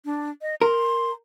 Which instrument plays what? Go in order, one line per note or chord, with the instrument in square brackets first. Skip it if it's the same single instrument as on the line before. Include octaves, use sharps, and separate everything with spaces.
[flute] D4
D#5
[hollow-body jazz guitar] A#4 [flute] C6